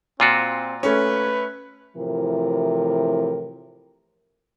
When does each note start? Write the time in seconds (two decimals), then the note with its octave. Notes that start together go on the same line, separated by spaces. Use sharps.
0.20 A#2 C4 F4 F#4
0.83 A3 C#4 B4
1.96 A2 C3 E3 F3 A#4